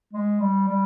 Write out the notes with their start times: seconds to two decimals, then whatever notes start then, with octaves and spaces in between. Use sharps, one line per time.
0.13 G#3
0.40 G3
0.68 G3